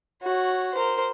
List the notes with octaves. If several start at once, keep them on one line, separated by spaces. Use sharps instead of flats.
F#4 C#5
A#4 C5